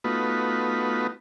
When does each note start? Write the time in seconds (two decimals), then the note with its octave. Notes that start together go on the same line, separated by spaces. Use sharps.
0.04 A3 B3 D#4 F4 F#4 B4